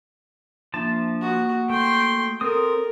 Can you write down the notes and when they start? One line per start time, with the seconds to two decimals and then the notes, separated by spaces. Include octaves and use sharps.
0.74 F3 A#3 D4 E5 A5
1.22 A#3 F#4 D#6
1.70 A3 G5 C6
2.41 C4 A4 A#4 D#6